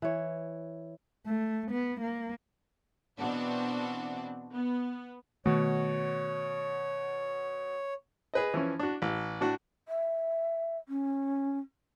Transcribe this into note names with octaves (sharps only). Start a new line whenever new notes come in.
E3 C#5
A3
B3
A#3
B2 E3 B3 C4 D4 F#4
B3
B2 D#3 A3 F#4 C#5
G#4 B4 D#5
E3 F3 C#4
D4 F#4
A1
A2 D4 F#4
E5
C#4